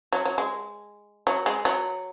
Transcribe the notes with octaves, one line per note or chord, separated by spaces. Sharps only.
F#3
F#3
G#3
F#3
G#3
F#3